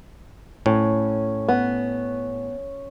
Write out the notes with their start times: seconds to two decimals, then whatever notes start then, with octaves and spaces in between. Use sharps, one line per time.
0.66 A2 C#4
1.48 B3